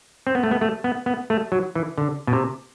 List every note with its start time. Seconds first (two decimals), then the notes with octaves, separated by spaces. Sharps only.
0.27 C4
0.35 B3
0.43 A3
0.51 B3
0.61 A3
0.84 B3
1.06 B3
1.30 A3
1.52 F#3
1.75 E3
1.98 D3
2.27 B2
2.33 C3